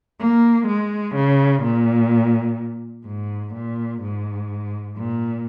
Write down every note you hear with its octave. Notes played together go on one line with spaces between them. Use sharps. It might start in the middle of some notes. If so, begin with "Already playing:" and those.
A#3
G#3
C#3
A#2
G#2
A#2
G#2
A#2